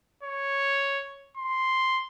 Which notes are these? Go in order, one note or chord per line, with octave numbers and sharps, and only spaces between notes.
C#5
C6